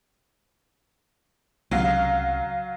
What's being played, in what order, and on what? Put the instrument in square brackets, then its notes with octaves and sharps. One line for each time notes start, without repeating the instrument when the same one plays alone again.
[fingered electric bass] C2 C#3 [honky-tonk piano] F#3 F5